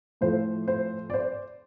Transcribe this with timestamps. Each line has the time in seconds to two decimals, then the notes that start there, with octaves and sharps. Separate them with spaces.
0.21 A2 F3 A3 C5
0.68 C5
1.10 D5
1.14 C5